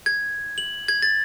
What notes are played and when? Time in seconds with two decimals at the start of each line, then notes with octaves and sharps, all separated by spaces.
0.06 G#6
0.58 F#7
0.88 G#6
1.03 A6